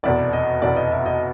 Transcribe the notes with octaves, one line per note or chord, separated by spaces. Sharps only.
F1 E2 B2 D5
D#5
F1 E2 B2 D5
D#5
E5
D#5